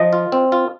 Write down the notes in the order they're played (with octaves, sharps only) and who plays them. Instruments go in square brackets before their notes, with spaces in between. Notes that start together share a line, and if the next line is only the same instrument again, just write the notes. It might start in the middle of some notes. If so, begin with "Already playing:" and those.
Already playing: [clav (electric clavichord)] F3 [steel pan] D#5
[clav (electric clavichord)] F4
C4
F4